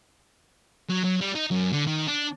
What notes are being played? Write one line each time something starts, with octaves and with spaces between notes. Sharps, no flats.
F#3
F#3
G3
D#4
F#2
D3
D#3
D4